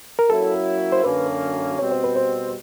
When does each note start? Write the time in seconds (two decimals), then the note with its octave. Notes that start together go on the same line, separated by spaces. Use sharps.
0.19 A#4
0.30 F#3 A#3 C#4 E4 A4
0.92 C5
1.04 F#2 D3 F#3 A#3 C#4 B4
1.79 B2 G3 C4 C#5
1.91 C5
2.04 B4
2.16 C5